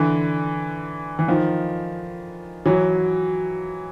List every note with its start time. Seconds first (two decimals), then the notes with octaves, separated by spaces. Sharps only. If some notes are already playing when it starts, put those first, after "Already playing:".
Already playing: D3 E3
1.19 E3
1.28 D#3 F3
2.66 E3 F#3